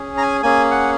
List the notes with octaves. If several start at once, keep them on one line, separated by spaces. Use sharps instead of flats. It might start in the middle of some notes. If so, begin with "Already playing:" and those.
Already playing: C#4 G#4
A#5
G#5
A#3 C#4 G#4 G#5
F#5